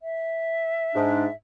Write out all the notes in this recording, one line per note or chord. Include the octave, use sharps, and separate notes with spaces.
E5
G#2 D4